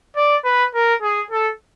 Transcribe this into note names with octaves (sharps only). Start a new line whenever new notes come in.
D5
B4
A#4
G#4
A4